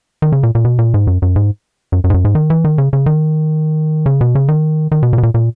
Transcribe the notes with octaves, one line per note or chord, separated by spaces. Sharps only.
D#3
C#3
A#2
A#2
B2
A#2
G#2
F#2
F#2
G#2
F#2
F#2
G#2
F#2
G#2
D#3
E3
D#3
C#3
C#3
D#3
C#3
B2
C#3
D#3
D#3
B2
A#2
B2
A#2
A#2